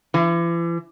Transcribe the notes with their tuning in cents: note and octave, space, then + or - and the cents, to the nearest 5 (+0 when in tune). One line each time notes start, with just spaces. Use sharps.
E3 +40